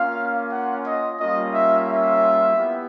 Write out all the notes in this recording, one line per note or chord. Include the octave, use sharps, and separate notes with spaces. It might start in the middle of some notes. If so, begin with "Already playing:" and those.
Already playing: A#3 C#4 F4 F5
F#5
D#5
G3 A#3 C#4 F4 D#5
E5
E5
B3 E4 G4